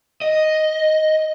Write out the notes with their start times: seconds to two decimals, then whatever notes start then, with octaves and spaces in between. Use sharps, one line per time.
0.21 D#5